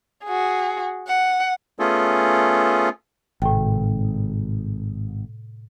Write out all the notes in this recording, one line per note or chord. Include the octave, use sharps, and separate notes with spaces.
F#4 G#4
F#5
A3 B3 C#4 F4 G#4 A4
G#1 A2 C3 G5